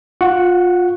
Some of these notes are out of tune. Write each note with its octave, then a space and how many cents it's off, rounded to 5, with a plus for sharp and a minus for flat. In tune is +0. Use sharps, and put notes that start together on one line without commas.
F4 +20 F#5 +0 C#6 +0